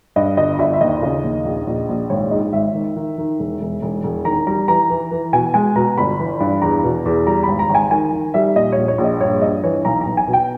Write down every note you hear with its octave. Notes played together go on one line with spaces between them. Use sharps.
G2 D#5
G1 D#5
G1 E5
E5
D#2 D#5
C#3
D#2
A#1
A#1
A#1
G#1 C#5
G#2 D#5
G#1 E5
D#3
D#3
D#3
E1
E1
E1
E1
D#3 A#5
G3 A#5
E3 A#5
E3
E3
B2 G#5
G#3 G#5
B2 A#5
G1 B5
E3
G2
E2 A#5
B2
E2
G3 A#5
G#1 B5
A#5
G#1
G#5
D#3 G#5
D#3
G3 E5
A#2 D#5
A#1 C#5
C#5
A#1
D#5
G2 C#5
G2 D#5
E3 C#5
B1 A#5
A#5
B1
G#5
B2
G5